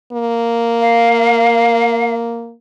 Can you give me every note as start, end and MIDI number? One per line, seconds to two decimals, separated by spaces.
0.12 2.54 58
0.81 2.13 77